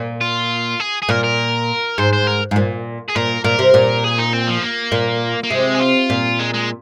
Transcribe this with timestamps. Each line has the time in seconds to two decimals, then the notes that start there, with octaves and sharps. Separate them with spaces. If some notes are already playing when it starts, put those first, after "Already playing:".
Already playing: A#2
0.21 F4
0.80 G#4
1.02 G#4
1.09 A#2 A#4
1.24 A#4
1.98 G#2 C5
2.13 C5
2.27 A#4
2.51 G#2
2.56 A#2
3.08 G#4
3.15 A#2 A#4
3.44 A#2 A#4
3.59 C3
3.74 A#2
4.04 G#4
4.18 D#4
4.33 C4
4.48 F3
4.62 A#3
4.92 A#2
5.44 A#3
5.50 C3 G#3
5.75 G#4
5.80 F4
6.10 A#2
6.39 G#3
6.54 G#3